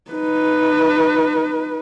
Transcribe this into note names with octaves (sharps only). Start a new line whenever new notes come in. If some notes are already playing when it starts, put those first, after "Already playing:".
D#4 B4